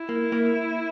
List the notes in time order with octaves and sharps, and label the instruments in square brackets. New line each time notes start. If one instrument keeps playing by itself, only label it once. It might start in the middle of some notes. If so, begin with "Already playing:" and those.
Already playing: [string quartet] E4
[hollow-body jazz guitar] A#3
A#3